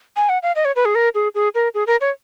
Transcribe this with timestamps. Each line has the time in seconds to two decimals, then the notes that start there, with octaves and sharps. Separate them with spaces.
0.16 G#5
0.29 F#5
0.43 F5
0.56 D#5
0.65 C#5
0.76 B4
0.85 G#4
0.95 A#4
1.15 G#4
1.35 G#4
1.55 A#4
1.74 G#4
1.87 A#4
2.01 C#5